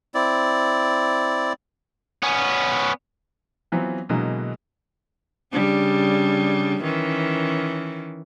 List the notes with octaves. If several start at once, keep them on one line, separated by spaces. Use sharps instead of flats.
C4 E4 D5
B3 C#4
E3 F#3 B3 C4 F4
B2 D3 E3 F#3 G#3 A#3
C#3 G3 D4
D#3 E3 C#4